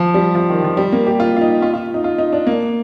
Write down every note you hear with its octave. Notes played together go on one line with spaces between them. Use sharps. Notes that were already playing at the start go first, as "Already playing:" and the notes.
Already playing: F3
G3
F3
D#3
F3
G3
A#3
G4
F4
F4
D#4
F4
F4
D#4
F4
D#4
D4
A#3